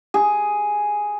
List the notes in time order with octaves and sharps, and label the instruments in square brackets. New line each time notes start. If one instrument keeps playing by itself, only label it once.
[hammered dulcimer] G#4